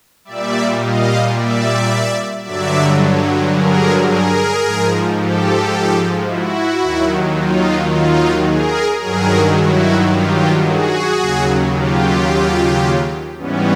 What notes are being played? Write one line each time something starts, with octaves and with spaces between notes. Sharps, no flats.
A#2 G3 D5 E5
D#5 F5
D5 E5
G2 D3 F#3 D5 E5
G#4 A#4
G#4 A#4
G#2 F3
G4 A4
E4 F#4
D#2 D#3 F#3
D#4 F4
D#4 F4
G#4 A#4
G2 D#3 F#3 G#4 A#4
E4 F#4
F4 G4
F#4 G#4
D#2 C#3 F#3
F4 G4
G#2 E3 G3 B3 C#4